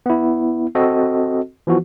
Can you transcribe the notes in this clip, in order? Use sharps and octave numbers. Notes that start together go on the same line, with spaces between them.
B3 E4
C4 F#4 A4 D#5
E3 F3 B3 F#4